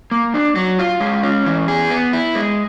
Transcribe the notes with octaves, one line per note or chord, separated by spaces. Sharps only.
A#3
D4
F#3
F4
G#3
C#4
E3
G#4
B3
E4
G#3